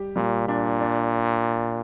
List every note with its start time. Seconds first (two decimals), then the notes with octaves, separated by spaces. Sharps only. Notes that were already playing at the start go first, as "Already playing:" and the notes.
Already playing: G3 G4
0.16 A#2 G3
0.48 A#2 D4
0.80 D4